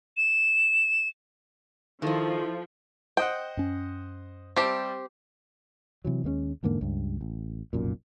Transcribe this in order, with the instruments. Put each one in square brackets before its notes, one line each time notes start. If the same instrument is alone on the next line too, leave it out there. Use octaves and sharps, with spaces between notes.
[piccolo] E7
[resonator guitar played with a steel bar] D#3 D#4 [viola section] F3 [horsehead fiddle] E4 A4
[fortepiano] C5 D#5 F#5 [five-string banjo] G5
[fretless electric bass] F#2 C#4
[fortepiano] G3 E5 A5 [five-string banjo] C4 G4
[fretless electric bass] C3 E3 F#3
D#2 G#3 A#3 C#4
E2 G#2 D3 A#3
C#2 G2
A1
F1 B1 F#2 A#2